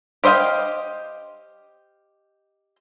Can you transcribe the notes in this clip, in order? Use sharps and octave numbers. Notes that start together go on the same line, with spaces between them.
G4 C5 D#5 F5 G5